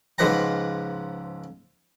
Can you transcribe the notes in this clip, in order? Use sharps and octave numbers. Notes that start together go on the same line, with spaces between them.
C#2 G#2 F3 B4 F#5 A#5